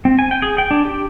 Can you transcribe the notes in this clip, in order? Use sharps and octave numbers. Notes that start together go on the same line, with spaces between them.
C4
G#5
G5
G#4
G5
D4
G4